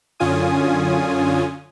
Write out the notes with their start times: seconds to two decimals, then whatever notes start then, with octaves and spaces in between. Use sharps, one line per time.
0.20 F#2 D3 C#4 F4 G#5 D#6